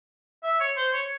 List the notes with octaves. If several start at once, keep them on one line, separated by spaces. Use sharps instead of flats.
E5
C#5
C5
C#5